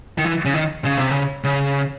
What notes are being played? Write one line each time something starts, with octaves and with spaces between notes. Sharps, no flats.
D#3
E3
C#3
D#3
C#3
C3
C#3
C#3